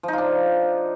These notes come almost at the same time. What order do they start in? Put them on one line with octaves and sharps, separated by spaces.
F3 D#4 F4 D4